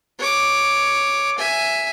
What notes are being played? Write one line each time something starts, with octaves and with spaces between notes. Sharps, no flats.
C#5 D6
E5 G#5